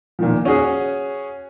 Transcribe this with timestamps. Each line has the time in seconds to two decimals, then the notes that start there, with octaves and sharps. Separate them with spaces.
0.19 A#2 D#3 F3
0.45 C#4 F#4 G#4